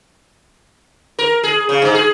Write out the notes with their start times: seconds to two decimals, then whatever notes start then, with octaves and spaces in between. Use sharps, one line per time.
1.19 A#4
1.44 G#4
1.69 C#3
1.82 G#2
1.95 G#4